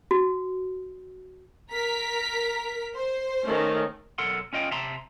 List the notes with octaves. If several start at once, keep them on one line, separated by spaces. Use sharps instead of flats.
F#4
A#4 A#5 B6
C5
D#3 A3 C#4
B1 A4 A#4 F#5 C6
C#4 F4 D#5 G5
C3 E5 A5 A#5 C6